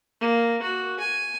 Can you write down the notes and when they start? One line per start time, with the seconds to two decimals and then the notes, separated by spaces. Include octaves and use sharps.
0.21 A#3
0.63 F#4
1.00 G#5